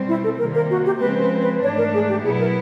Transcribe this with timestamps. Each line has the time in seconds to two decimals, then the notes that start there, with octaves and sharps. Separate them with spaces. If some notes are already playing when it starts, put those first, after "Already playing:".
Already playing: B2 G3 C4
0.08 E4
0.24 A4
0.39 C3 D#3 G3 A#3 A#4
0.55 A#4
0.70 F#4
0.86 G4
1.01 C#3 F3 G#3 C4 B4
1.22 B4
1.42 B4
1.63 G#2 E3 A3 D4 C#5
1.78 A#4
1.94 G#4
2.09 G4
2.25 B2 F#3 B3 E4 G#4
2.40 A#4